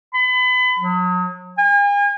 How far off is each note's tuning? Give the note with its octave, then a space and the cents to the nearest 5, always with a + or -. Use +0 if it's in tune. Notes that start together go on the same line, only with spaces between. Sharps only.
B5 +30
F#3 -35
G#5 -40